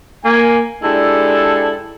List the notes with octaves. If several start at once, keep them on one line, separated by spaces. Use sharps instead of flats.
A#3 G#5
G#3 D4 E4 G4 A4